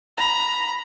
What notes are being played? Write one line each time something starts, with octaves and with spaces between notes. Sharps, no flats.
A#5 B5